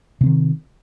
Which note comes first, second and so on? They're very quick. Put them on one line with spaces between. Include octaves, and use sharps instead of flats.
C3 C4 D#3